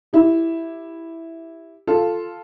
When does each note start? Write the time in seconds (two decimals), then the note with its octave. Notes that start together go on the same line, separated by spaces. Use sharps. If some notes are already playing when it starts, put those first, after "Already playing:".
0.13 E4 G4
1.87 F4 A4